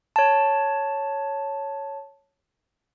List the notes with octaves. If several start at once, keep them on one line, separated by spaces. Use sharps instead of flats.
C#5 A5